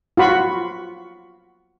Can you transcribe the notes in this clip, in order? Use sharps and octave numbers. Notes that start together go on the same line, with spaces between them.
F4 F#4 B5 C#6